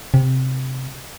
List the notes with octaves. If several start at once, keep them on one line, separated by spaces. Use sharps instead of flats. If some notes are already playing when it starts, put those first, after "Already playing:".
C3